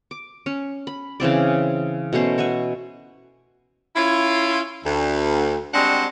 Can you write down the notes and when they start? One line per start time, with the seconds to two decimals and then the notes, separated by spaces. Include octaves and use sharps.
0.11 D6
0.46 C#4
0.87 B5
1.20 C#3 E3 C4 D5
2.13 B2 A3 C#4 C5
2.38 C#5 E5 F#5 G#5
3.96 C#4 E4 F4
4.84 D2
5.74 G3 G#3 C4 D4 F#4 F#5